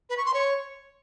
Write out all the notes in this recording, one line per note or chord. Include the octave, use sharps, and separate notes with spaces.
B4
C#6
C6
C#5